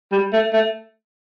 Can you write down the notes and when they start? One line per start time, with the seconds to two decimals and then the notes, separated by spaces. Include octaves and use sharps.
0.12 G3
0.33 A3
0.53 A3